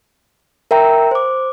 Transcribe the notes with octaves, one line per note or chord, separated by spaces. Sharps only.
A#4 E5 G5 A#5
C5 D6